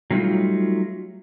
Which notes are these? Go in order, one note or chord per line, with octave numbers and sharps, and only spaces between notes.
F#3 G3 A3 B3 D#4 F4